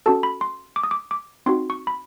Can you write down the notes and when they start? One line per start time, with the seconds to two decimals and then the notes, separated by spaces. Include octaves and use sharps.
0.06 C#4 F#4 A4 A5
0.23 B5
0.41 C6
0.76 D6
0.84 D#6
0.91 D6
1.11 D6
1.46 C4 D#4 F#4 C6
1.70 C#6
1.87 B5